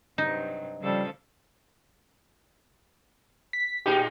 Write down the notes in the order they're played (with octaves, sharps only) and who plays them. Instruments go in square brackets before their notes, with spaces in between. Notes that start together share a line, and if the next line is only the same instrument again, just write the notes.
[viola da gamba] G2 C3 F#3 [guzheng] D#4
[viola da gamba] C#3 F3 A4 [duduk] G3
[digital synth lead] B6
[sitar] A2 D#4 G#4 [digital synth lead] G4